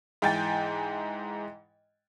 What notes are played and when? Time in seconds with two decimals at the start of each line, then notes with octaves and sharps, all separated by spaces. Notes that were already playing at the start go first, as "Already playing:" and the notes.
0.22 G#2 E3 G5 G#5 A6